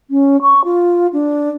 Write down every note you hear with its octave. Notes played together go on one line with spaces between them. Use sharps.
C#4
C#6
F4
D4